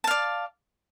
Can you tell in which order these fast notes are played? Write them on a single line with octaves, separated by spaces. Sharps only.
A5 F5 D5